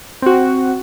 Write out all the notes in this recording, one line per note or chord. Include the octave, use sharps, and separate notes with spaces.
C4 F#4